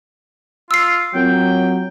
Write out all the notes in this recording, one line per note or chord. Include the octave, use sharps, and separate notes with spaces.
F4 E6 C7
F#3 C4 F4 A#4 G5